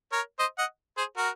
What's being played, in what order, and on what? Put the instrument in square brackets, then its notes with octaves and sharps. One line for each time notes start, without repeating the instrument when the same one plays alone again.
[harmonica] A#4 C#5
C5 D#5
D#5 F#5
G#4 C5
F#4 A#4